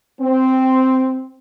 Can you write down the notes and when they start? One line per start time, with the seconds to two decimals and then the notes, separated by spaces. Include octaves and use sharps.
0.21 C4